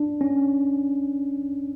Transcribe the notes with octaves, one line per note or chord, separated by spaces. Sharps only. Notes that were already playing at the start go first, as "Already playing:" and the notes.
Already playing: D4
C#4